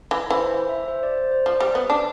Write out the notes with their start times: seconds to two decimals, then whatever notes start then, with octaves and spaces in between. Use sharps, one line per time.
0.11 E3
0.30 E3 C5
0.69 E5
0.88 C5
1.03 D5
1.17 C5
1.31 C5
1.46 F3 D5
1.60 G3
1.75 B3
1.90 D4